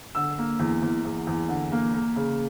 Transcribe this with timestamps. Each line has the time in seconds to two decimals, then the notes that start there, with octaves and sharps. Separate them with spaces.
0.15 D3 E6
0.38 A#3
0.60 E2
0.82 E2
1.05 E2
1.27 E2
1.49 D3
1.72 A#3
1.94 A#3
2.16 C#3